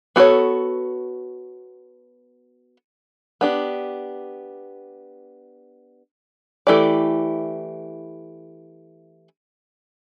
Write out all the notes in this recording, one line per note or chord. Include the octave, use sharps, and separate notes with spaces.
B3 F#4 A4 C#5
B3 D4 G4
E3 A3 E4 G4 D5